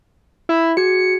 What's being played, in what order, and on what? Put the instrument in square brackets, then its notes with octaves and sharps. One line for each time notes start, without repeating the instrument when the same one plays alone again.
[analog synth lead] E4
[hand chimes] F#4 G#4 G#6 [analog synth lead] C#7